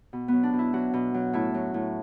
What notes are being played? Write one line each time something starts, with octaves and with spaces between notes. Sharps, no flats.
B2
F#3 B3
D4
B2
E4
F#3 F#4
B2
F#3
A2 E4
F#3
A2